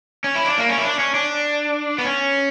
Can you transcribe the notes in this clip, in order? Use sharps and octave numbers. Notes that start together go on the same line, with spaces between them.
C#4
E4
D4
A#3
C#4
E4
D4
C#4
D4
B3
C#4